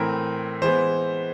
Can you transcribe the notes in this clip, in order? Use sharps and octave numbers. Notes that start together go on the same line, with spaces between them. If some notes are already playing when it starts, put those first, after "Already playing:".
Already playing: A2 E3 A3 C4 A#4
E3 G#3 B3 C5